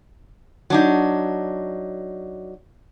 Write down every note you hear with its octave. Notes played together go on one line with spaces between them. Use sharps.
F#3 D4 D#4